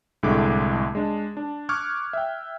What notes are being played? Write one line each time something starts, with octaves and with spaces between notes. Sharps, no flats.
C2 A2 D3 G#3 D6
G#3 D4
D4
C#6 D6 F6 F#6 G#6
E5 G5